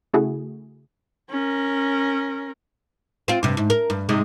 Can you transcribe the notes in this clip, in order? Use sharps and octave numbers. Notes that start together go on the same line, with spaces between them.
C#3 A3 E4 F#4 G#4
C#4 A#4
C4 F4
G2 C3
G#2
A#4
G2
G#2 C3 G#3